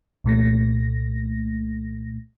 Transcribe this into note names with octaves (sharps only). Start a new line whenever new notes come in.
C2 A#2 A3 A#6